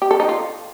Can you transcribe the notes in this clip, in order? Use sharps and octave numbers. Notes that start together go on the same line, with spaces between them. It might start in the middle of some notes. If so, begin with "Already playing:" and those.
G4
A4
D#4
F4